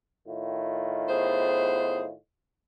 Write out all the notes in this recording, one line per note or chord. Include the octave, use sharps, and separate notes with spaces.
A2 D#3 F4
B3 G#4 C5